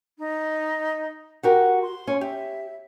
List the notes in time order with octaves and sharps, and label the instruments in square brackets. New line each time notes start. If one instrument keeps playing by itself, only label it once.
[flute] D#4
[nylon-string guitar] F#4 G4 A#4 [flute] F#5
[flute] C6
[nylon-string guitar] C#4
[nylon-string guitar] G4 [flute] E5